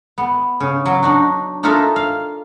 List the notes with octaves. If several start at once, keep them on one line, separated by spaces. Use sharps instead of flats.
B3
C#3
F#3
D4 D#4 F#4
D4 D#4 F4 A4 A#4 E5
F5